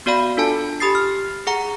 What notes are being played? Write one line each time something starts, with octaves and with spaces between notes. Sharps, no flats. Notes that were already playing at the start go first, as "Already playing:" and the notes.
B3 F#4 D5 F5 B5
D4 F4 A4 G#5 A5
G4 B5 D#6 A6 C7
F6
G#4 F#5 A#5